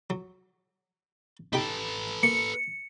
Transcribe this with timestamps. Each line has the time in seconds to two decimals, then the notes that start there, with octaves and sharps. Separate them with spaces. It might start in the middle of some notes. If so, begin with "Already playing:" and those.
0.10 F#3
1.53 D#4 G4 A4 B4 G5
2.23 A#3 C#7